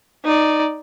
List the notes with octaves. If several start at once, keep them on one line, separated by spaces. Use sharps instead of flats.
D#4 D5